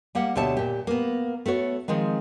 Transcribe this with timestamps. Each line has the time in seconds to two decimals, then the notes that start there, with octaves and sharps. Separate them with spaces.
0.15 G3 A#3 G4 F#5
0.35 D2 B2 G4 C#5 E5 A5
0.57 A#2 G4
0.87 A#3 B3
1.46 A3 B3 F#4 C#5
1.88 D#3 F3 G#3 C4